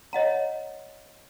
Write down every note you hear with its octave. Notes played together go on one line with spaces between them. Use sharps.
C#5 D#5 F#5 A#5